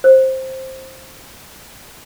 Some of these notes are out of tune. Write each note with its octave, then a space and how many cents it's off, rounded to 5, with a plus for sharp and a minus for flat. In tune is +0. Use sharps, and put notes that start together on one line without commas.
C5 +10